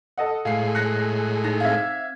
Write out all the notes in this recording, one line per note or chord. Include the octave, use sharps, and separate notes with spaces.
A4 D#5 F#5
A2 G#3 F5 C7
F#6 A#6 C#7
D#4 A#6
C4 E5 F5 G#6